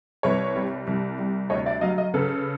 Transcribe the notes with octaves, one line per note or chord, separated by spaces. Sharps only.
C2 B4 C#5
G3
C2
G3
D2 C#5 D#5
D5 E5
F#3 D#5 F5
D#5 F5
C#3 A4 B4